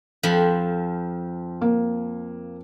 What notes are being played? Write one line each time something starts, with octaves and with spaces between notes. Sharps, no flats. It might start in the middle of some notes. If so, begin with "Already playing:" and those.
F2 F3 B5
A#3